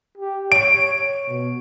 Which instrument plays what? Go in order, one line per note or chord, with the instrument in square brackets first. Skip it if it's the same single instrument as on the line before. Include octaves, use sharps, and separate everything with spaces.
[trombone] G4
[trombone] C#5 [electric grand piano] D7
[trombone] B2